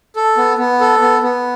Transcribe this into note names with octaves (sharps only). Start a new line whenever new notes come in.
A4
B3
B3
A4
B3
B3